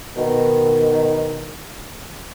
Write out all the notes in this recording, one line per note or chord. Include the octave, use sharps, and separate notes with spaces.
B2 D#3